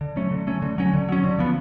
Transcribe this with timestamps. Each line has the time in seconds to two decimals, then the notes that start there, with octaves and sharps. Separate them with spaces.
0.01 D3
0.16 F#3 A3 C#4
0.31 D3
0.47 F#3 A3 C#4
0.62 D3
0.78 F#3 C#4
0.93 D3
1.09 F#3 C#4
1.24 D3
1.39 F3 B3